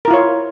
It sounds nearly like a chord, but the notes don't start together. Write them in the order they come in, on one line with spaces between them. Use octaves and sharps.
A#4 E4 F4 C#5